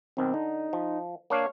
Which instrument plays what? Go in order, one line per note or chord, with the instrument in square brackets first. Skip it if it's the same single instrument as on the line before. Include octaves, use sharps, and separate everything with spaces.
[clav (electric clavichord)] B1 D#3 [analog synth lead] C4
[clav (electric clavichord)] D3 [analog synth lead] D#4
[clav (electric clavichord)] F3
[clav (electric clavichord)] A#3 D4 F5 [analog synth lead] C#5